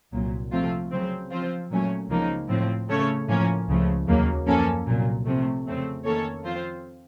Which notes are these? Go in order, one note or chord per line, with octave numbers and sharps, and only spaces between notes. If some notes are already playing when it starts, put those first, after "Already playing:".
C2 A#2 F#3
C3 F3 A3 C4 F4
C#3 F#3 C4
F3 C4 F4 C5
A#2 F#3 A3 C#4
C#2 C#3 F3 A#3 D#4
A2 F3 C4
C#3 A3 C#4 A4 C#5
A2 F3 A#3 C#4
C#2 C#3 F3 A3
D#2 C#3 F#3 A#3
F#2 F3 A#3 C#4 A4
C2 A#2 F#3
C3 F3 A3
F2 C#3 A3 C4
D#3 A#3 C#4 A4 C#5
F3 C4 F4 C5